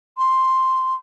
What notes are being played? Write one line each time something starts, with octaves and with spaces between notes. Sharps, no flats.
C6